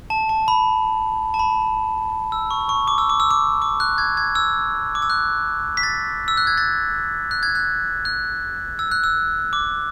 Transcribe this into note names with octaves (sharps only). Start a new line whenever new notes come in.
A5
A5
B5
A5
B5
E6
C#6
C#6
D6
E6
D6
E6
D6
D6
F#6
G#6
G#6
E6
D6
E6
F#6
B6
A6
E6
F#6
G#6
A6
F#6
G#6
F#6
F#6
E6
F#6
E6
D6